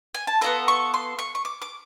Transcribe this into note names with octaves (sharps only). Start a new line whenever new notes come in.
G#5
A5
B3 D4 F4 A4 A#5
C#6
C6
C#6
C#6
D6
D6